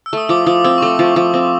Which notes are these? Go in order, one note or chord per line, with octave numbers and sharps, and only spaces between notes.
E6
A3 D#6
F3 D6
F3 D#6
C4 E6
C#6
A3 D6
F3
F3 D6
C4